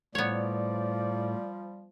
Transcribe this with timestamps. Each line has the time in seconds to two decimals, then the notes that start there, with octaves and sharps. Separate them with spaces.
0.15 A2 F3 G3 B3 C#5 D5